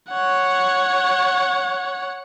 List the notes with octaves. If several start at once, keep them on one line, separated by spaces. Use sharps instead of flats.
C#5 F#5